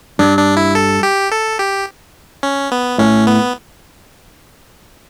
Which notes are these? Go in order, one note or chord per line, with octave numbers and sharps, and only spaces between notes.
G2 D4
D4
E4
A4
G4
A4
G4
C#4
B3
A2 C#4
B3